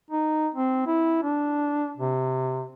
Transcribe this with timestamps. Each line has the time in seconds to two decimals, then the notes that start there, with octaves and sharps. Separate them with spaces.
0.11 D#4
0.55 C4
0.87 E4
1.23 D4
1.98 C3